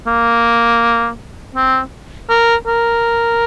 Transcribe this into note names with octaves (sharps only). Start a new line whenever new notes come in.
A#3
C4
A#4
A#4